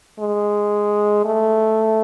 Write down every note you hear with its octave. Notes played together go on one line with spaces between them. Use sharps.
G#3
A3